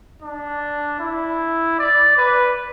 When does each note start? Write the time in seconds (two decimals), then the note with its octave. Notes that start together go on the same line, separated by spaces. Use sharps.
0.22 D4
1.00 E4
1.79 D5
2.17 B4